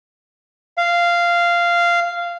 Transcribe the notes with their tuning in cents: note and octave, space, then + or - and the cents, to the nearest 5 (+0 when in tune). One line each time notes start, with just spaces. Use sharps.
F5 -10